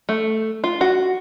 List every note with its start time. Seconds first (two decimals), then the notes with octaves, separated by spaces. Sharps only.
0.09 A3
0.64 F4
0.81 F#4